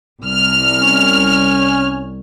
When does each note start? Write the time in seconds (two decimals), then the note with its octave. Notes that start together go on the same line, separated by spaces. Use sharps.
0.22 C2 F6
0.80 C#4